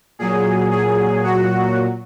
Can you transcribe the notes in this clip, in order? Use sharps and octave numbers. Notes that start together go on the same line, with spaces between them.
A#2 F#3 G#4
G#4
F#4